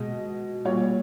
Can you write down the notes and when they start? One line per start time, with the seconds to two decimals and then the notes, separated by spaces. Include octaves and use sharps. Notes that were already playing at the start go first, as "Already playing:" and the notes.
Already playing: B2 G#3 D#5
0.65 A#2 G3 C#5